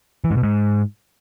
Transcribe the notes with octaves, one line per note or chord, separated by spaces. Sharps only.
E3
G#2
B2
G#2